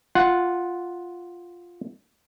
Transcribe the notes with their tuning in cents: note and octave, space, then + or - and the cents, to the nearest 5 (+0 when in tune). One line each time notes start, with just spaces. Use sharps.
F4 +0 F#5 -5